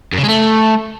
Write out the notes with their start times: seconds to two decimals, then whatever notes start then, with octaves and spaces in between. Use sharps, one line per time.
0.13 F#2
0.18 C#3
0.23 G#3
0.29 A3